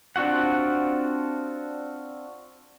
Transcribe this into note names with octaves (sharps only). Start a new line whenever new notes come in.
C4 D4 F4 F#4 F#5